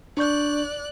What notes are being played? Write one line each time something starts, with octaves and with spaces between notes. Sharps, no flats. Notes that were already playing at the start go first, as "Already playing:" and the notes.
D4 D5 C#6 F#6 G6